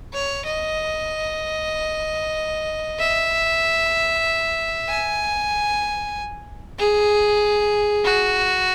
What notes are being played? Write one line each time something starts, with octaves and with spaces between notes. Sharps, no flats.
C#5
D#5
E5
G#5
G#4
F#4